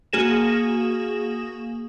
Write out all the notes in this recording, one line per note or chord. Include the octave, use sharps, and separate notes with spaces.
A#3 F#4 G#4 A#6 E7